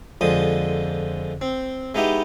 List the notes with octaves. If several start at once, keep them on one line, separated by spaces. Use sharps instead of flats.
F2 D3 F3 G#3 D#6
C4
G#3 B3 D#4 E4 G4